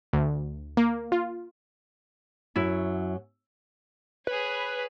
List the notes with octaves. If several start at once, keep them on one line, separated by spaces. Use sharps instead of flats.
D2
A#3
F4
F#2 F#3 E4
G#4 B4 C#5